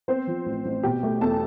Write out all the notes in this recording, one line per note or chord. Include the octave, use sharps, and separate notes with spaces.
B3 C4 C5
F3
A1
A1
B2 G4 G5
A3
E2 A4 A5